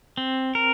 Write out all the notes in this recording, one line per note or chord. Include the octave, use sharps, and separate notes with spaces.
C4
A#4